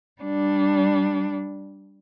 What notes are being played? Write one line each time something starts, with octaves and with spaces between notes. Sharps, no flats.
G3 D4